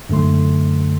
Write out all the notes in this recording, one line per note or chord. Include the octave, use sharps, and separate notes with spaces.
F#2 D3 A3 C6